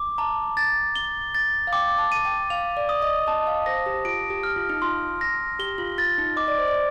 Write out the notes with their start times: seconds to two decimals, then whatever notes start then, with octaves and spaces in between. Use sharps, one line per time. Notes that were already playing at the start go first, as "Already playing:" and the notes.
Already playing: D6
0.18 A5 A#5
0.57 A6
0.96 G7
1.35 A6
1.67 F5
1.73 G5 D6
1.98 A5
2.12 D#7
2.25 G5
2.50 F5 F7
2.77 D5
2.89 D#6
3.02 D#5
3.27 D#5 A5
3.47 F5
3.66 C5 A#6
3.86 G4
4.05 F4 D7
4.30 G4
4.43 F6
4.56 F4
4.69 D#4
4.82 F4 C6
5.21 A#6
5.59 G4 G7
5.78 F4
5.98 F4 A6
6.18 D#4
6.36 D#5 D6
6.48 D5
6.58 C5
6.68 D5